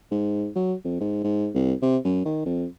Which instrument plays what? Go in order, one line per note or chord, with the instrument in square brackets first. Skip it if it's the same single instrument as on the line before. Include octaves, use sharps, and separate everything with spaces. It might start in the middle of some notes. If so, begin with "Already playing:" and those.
[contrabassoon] G#2
F#3
F2
G#2
G#2
C2
C3
F#2
D#3
F2